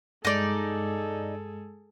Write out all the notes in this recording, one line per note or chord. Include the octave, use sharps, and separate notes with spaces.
G2 G#3 D#4 G#4 A4 D5